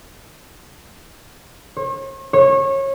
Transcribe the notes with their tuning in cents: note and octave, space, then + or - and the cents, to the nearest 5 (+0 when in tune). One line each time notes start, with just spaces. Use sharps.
C#5 -45
C#5 -25